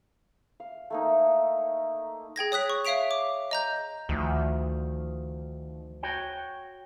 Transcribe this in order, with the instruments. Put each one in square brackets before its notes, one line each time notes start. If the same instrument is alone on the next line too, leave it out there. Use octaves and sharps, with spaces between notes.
[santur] F5
A3 A#3 D#4
[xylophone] G#4 G5 G#6 A#6
C#5 D#6 F#6 B6
C#6
C#5 E5 F5 B6 D7 F7
D6
D#5 A#5 G6
[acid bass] D2 [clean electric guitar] D#3 F3
[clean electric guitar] F#4 C#5 G5